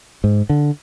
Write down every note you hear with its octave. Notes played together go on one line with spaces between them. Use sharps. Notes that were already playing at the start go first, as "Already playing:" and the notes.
G#2
D3